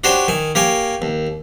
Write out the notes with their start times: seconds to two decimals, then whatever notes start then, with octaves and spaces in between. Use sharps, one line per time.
0.04 D4 F#4 G4 C5 C#5
0.28 D#3 G#5
0.55 A#3 G4 C#5 G#5
1.02 D#2